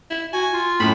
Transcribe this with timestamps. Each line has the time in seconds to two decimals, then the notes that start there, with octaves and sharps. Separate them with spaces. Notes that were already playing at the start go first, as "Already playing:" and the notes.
0.11 E4
0.33 F#4 G#5
0.53 F4
0.80 F#2 A2 B5